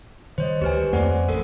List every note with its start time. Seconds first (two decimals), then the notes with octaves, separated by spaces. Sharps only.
0.38 D#3 G3 C5 C#5 D#5
0.62 D2 G4 B4 G#5
0.93 F2 A3 A#3 C5 D5 F#5
1.28 A1 A4 A#4